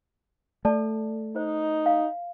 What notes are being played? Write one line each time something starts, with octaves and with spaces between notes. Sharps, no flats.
A3 A4 D5 A5
D#4 C5
F5